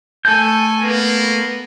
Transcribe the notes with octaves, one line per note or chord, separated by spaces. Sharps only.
A3 A4 G#5 G6
A#3 B3